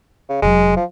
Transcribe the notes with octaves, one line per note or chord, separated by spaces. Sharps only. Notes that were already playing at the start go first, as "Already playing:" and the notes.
C#3
F1 F#3 G#3
F3